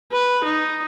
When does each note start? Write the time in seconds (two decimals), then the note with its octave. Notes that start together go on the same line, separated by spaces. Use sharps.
0.12 B4
0.44 D#4